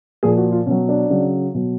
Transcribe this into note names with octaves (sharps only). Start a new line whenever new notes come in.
A#2 F3 G#4
F#4
F4
B2 F#3 C#4
D4
C#3 F#3
B2 F#3